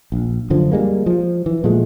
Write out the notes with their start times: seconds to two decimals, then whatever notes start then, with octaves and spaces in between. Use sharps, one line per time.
0.12 A#1
0.50 F#2 D3 F3
0.72 G3 G#3 A#3
1.06 F3
1.46 E3
1.64 A#2 F3 G#3 A3